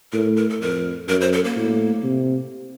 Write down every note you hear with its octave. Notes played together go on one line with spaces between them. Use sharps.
A2 A#4
A#4
A4
F2 A#4
F#2 A#4
C5
A4
A#3
A2
C3